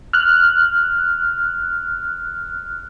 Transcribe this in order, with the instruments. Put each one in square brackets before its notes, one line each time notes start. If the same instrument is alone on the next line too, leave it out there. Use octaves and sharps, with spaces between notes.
[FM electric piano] F6 F#6